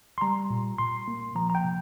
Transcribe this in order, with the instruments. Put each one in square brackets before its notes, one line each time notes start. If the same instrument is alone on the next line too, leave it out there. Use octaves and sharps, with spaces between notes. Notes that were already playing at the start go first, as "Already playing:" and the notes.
[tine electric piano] C6
G3 A#5
A#2
A#2 C6
A#3
F3 A#5
A#5
G5
C3